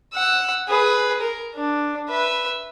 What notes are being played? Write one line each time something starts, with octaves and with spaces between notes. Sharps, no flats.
F#5 E6
G#4 B4
A#4
D4
B4 E5